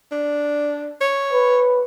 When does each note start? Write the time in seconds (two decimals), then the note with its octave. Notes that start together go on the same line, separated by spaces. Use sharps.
0.11 D4
1.01 C#5
1.33 B4